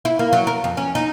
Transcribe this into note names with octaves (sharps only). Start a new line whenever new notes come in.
E4
A#3
F#3
A#4
F2
C#4
D#4